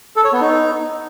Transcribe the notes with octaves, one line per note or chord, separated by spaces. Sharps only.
A4
C#5
B3
D#4